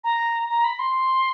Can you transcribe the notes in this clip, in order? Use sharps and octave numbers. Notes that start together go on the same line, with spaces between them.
A#5
A#5
B5
C6